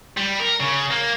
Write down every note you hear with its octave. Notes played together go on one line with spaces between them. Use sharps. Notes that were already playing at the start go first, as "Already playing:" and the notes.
G3
A#4
C#3
A#3